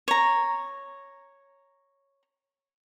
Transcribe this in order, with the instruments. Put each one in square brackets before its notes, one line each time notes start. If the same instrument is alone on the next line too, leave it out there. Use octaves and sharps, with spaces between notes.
[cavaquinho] C#5 A#5